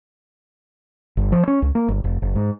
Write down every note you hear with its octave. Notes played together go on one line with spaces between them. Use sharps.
G1
F3
C#4
C#2
A#3
G1
F1
F#1
G#2